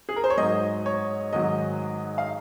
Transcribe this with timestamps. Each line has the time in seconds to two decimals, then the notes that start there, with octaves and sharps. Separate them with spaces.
0.09 G#4
0.16 A#4
0.24 C5
0.30 C#5
0.37 G#2 F#3 D#5
0.86 C#5
1.33 G#2 D#3 F#3 D#5
2.18 F5